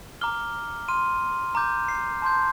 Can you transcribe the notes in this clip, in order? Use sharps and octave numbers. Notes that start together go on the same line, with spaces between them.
A#5 D6 F6 G7
C6 F6 D#7
A#5 D6 G6
C7
A5 C6 G6